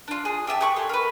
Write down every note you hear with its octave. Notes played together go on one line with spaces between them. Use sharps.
D4 F4
G#4
G4 E5 G#5 A5
G4 C#6 F#6
A4 C#5 C6
A#4 B4